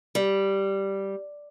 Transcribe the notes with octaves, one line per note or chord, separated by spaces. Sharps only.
G3